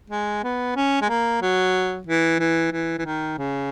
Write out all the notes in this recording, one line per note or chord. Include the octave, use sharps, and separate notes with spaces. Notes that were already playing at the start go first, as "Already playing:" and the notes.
G#3
B3
C#4
G#3
A#3
F#3
E3
E3
E3
E3
D#3
C#3